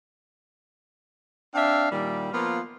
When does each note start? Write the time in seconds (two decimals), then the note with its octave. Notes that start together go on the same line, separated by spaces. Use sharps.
1.54 C4 D4 E5 F5
1.90 A#2 D#3 G3
2.32 F3 A#3 B3 F4